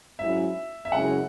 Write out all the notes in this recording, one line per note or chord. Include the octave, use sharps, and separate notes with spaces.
G#2 F#3 C#4 E4 E5
E5
F#2 C#3 G#3 E4 C#5 F#5